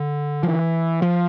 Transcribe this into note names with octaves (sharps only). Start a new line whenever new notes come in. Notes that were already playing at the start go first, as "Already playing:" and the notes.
Already playing: D3
F3
E3
F3